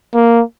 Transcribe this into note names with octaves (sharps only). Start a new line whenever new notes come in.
A#3